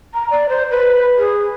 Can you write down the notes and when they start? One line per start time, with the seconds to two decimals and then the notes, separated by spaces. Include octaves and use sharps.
0.14 A#5
0.31 D5
0.49 C5
0.71 B4
1.18 G#4